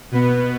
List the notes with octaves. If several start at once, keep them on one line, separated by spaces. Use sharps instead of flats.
B2 B3 B4